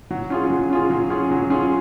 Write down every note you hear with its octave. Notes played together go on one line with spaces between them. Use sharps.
F#3
C#4 F4 G#4
F#3
C#4 F4 G#4
F#3
C#4 F4 G#4
F#3
C#4 F4 G#4